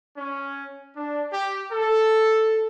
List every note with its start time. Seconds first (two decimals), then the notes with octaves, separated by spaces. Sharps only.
0.17 C#4
0.96 D4
1.33 G4
1.72 A4